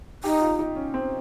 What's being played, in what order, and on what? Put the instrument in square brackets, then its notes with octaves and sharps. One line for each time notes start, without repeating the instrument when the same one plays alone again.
[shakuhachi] D#4 [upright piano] G4
[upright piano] F4
D#4
C#4
C4